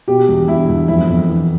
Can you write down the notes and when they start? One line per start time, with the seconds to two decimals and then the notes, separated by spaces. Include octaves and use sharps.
0.08 B2 G4
0.29 E2
0.48 E2 E4
0.69 E2
0.88 F2 E4
1.09 F2
1.28 E3